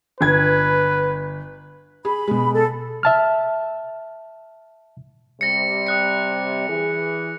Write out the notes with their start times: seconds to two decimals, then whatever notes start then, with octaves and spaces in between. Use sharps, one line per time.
0.21 G1 B4 G#6
2.05 G#4 B5
2.28 B2 G#3
2.54 A4
3.03 E5 A5 F6
5.41 C3 G3 A#6 C#7
5.87 D#6 F#6 C#7
6.68 E3 G#4